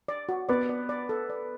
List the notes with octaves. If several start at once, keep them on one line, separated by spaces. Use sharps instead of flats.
D5
F#4
B3 D5
D5
D5
A4
D5